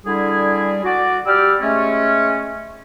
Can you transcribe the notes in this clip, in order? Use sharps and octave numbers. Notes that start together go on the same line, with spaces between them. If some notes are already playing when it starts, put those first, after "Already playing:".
D3 G3 E4 G#4
F#4 D5
G3 G4 D5 E6 F6
G#3 A3 C#4